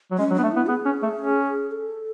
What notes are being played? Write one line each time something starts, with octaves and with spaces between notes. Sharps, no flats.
F#3
G#3 C#4
F#3
B3 D4
A3
B3 E4
B3 G#4
C#4
A3
C#4
A4